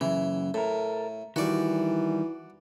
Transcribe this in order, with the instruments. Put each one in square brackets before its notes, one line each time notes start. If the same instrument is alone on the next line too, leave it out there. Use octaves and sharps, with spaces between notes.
[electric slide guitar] F#2 C#3 [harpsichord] E3
[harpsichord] A2 [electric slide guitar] A4 A#4
[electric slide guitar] D#3 G3 [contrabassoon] E3 [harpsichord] F#4 D5